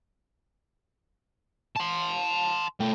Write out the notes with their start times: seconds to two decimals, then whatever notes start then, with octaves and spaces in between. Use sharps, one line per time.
1.76 A5 C6
2.80 A3 G5